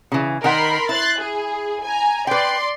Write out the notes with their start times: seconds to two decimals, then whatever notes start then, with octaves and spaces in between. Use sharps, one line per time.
0.12 C#3 E3
0.44 D#3 A#4 F#5 B5 C6
0.89 E4 C6 F#6 A6
1.19 G#4
1.83 G#5 A#5
2.27 B4 D5 G5 C6